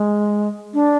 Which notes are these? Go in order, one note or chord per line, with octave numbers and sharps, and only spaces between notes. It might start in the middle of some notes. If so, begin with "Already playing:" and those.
Already playing: G#3
D4